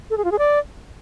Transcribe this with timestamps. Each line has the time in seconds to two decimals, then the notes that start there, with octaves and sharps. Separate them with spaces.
0.10 A4
0.17 G#4
0.24 F4
0.32 G#4
0.39 D5